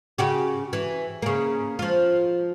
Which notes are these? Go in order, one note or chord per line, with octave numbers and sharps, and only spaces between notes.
C#3 F#4 G4
E3
C#3 A#3
F3 F4